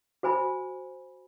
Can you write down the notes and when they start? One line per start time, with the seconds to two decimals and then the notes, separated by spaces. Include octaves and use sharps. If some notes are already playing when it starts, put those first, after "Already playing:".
0.23 F#4 C5 G#5 B5